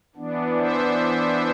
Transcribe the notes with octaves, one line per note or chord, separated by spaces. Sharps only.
E3 B3 D4
C5 E5